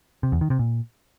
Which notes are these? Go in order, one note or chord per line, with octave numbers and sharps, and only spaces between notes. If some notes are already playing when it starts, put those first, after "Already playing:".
C3
E2
D#3
C3
A#2